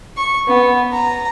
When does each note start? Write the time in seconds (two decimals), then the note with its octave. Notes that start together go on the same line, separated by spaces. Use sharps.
0.17 C#6
0.48 B3
0.92 A#5